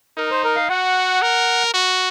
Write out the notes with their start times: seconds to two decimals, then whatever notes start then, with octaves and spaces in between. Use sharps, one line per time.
0.17 D#4 A#4
0.31 C5
0.44 A#4
0.56 F5
0.69 F#4 F#5
1.22 A#4
1.74 F#4